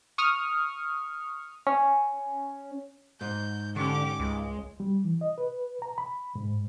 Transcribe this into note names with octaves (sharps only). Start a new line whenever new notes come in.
C#6 D#6 F6
C#4
G#2 G6
D3 C#4 G4 D6
C#2 G#3
G3
E3
D#5
B4
A#5
B5
G#2